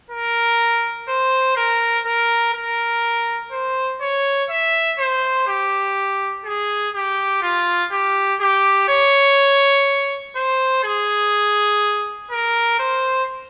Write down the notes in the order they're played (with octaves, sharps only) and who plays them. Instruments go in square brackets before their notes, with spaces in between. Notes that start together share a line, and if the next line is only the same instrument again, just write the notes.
[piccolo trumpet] A#4
C5
A#4
A#4
A#4
C5
C#5
E5
C5
G4
G#4
G4
F4
G4
G4
C#5
C5
G#4
A#4
C5